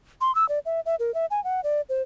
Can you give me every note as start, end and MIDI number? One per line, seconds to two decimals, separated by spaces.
0.21 0.34 84
0.35 0.47 88
0.49 0.59 74
0.66 0.80 76
0.86 0.95 76
0.99 1.14 70
1.14 1.26 76
1.31 1.43 80
1.44 1.61 78
1.64 1.81 74
1.89 2.02 72